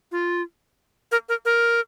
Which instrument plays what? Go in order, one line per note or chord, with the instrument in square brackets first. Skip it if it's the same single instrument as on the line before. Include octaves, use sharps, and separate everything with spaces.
[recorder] F4
A#4
A#4
A#4